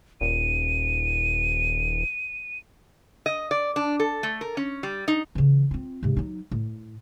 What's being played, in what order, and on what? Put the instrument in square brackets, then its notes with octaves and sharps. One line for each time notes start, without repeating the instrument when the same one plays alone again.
[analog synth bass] D#1 [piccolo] D#7
[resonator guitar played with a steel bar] D#5
D5
D4
A4
A3
A#4
C#4
G3
D#4
[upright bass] C#3 E3
C4 F4
G#2 C3
F#3 D#4
A2